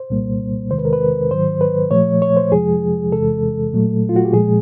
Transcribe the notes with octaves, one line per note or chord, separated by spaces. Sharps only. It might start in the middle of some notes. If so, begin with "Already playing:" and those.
Already playing: C5
C2 A#2 G3 A#3
E2 C3 D#3 G#3 C5
B4
A#4
B4
G#2 D#3 F#3 C5
B4
A#2 F3 A3 C#5
C#5
C5
F2 C3 F3 G#3 G#4
E2 C3 E3 G#3 A4
A#2 F#3 A3
F4
F#4
G4
A#2 F3 G#3 G#4